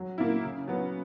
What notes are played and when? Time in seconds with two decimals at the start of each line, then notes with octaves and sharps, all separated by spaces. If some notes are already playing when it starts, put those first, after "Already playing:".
Already playing: F#3
0.18 A#3 E4
0.43 C#3
0.68 F#3 B3